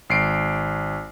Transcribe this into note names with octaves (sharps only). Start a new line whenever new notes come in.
G#1 C7 D7